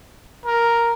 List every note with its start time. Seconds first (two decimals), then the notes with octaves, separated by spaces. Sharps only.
0.46 A#4